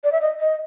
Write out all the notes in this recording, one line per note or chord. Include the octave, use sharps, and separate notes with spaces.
D5
E5
D#5
D#5